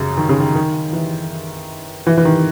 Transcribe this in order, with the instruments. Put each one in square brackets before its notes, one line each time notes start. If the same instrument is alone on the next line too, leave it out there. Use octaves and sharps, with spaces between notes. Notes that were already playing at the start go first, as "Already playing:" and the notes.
Already playing: [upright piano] F#2 C#3
D#3
C#3
D#3
D#3
E3
E3
E3
D#3